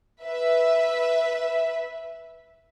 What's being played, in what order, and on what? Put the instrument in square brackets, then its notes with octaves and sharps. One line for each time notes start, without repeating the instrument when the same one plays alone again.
[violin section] B4 E5